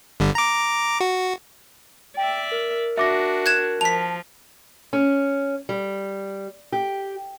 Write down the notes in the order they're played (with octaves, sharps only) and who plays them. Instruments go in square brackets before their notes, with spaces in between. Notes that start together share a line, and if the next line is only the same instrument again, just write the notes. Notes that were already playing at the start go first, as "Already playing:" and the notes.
[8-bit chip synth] G1 D3 G3
A#5 D6
F#4
[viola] D5 E5 [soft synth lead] G5
[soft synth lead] A#4
[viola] D4 F#4 [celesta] E5 D6 A#6
[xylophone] F#6 G#6 E7
[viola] F3 [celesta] A5 [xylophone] B6 F7
[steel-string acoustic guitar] C#4
G3
G4